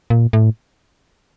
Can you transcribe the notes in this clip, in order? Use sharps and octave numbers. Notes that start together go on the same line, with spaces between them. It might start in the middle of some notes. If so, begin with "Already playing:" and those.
A#2
A2